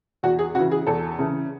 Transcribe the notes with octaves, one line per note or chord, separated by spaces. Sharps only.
E2 F#4
G#4
C#3 E3 F#4
G#4
E2 A4
C#3 E3